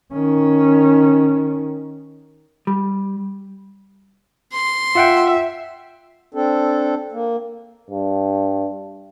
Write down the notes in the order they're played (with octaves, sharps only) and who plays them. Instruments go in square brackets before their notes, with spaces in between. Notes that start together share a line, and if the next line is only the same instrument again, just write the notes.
[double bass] D#3 C#4
[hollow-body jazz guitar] G3
[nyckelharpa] C6
[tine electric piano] F4 F#5 G5 [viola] E5
[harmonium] C4 D4 A4
A#3
[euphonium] G2